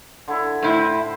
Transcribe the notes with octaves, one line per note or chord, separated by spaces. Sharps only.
D3 E4
A2 E4 C5